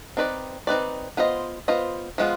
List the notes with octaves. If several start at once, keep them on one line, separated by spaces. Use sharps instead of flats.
C4 D#4 B4 D5
C4 D#4 B4 D5
B3 F4 C5 D#5
B3 F4 C5 D#5
F3 G#3 B3 F4